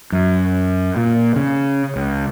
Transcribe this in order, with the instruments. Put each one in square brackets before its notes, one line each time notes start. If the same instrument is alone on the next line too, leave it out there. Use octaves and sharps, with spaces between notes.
[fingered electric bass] F#2
A#2
C#3
C#2